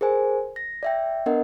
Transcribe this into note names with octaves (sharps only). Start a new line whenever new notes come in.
G#4 A#4 C5 G#5
A#6
D5 E5 G5
B3 D4 A#4 D#5 F#5